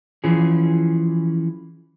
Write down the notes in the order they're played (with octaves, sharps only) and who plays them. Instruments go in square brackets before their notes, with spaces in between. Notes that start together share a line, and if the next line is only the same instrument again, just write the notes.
[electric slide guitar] E3 F3 C#4 G#4